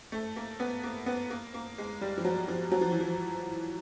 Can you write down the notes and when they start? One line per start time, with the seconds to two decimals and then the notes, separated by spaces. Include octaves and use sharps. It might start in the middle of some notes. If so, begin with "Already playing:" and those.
0.12 A3
0.36 A#3
0.60 B3
0.83 A#3
1.06 B3
1.30 A#3
1.54 A#3
1.78 G#3
2.01 G3
2.18 F3
2.25 F#3
2.48 F3
2.72 F#3
2.81 F3
2.91 E3
3.01 F3